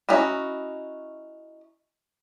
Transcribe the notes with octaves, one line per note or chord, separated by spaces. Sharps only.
C#4 D#4 E4 F#4